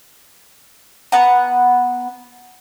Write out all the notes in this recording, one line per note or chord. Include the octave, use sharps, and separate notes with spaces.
B3 F#5 A#5